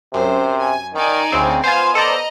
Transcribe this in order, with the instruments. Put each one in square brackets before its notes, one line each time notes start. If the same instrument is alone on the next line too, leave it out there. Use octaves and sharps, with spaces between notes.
[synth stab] F#2 [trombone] C3 [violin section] C5
[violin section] G#5
[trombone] D#3 [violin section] D#4 D5 G#5
[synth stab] D2 C4 [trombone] C#3
[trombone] B3 [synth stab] F4 C5 [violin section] F5 G#5
[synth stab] A4 C5 D5 [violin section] D#5 A#5